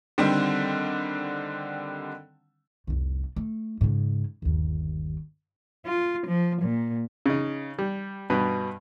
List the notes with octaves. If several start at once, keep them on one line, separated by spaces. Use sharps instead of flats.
D3 D#3 G3 C4
F1 C2
A3
G#2 C#3
G1 D#2
F4
F3
A#2
C#3 D#4
G3
G2 B2 B3